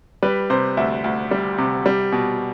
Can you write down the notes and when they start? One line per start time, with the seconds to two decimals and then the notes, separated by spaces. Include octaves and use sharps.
0.23 G3 B4
0.50 C3 C5
0.77 D2 E5
1.04 D2
1.31 G3
1.58 C3
1.86 G3
2.12 B2